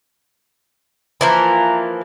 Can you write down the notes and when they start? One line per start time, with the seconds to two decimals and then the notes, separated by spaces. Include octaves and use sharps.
1.21 E3 F3 A#3 A#5